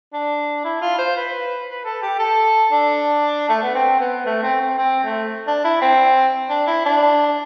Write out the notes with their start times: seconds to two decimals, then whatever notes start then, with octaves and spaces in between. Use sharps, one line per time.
0.13 D4
0.64 E4
0.82 F4
0.98 C5
1.17 B4
1.69 B4
1.85 A4
2.02 G4
2.19 A4
2.72 D4
3.49 A3
3.62 B3
3.75 C4
4.00 B3
4.26 A3
4.43 C4
4.61 C4
4.78 C4
5.04 A3
5.48 D4
5.64 E4
5.82 C4
6.50 D4
6.67 E4
6.85 D4